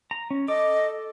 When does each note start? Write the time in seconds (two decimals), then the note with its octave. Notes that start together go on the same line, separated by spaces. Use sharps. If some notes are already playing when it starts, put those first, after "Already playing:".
0.11 A#5
0.31 C#4
0.48 A4 D#5 D6